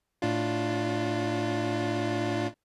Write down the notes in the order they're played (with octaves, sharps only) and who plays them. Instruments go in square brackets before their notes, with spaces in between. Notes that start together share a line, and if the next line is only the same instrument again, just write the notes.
[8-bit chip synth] A2 D4 F4